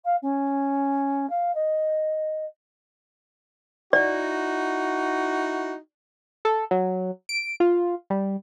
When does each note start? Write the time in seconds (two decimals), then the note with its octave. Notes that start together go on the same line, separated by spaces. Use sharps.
0.04 F5
0.22 C#4
1.29 F5
1.54 D#5
3.93 D#4 E4 F#4 D5
6.45 A4
6.71 F#3
7.29 D7
7.60 F4
8.10 G3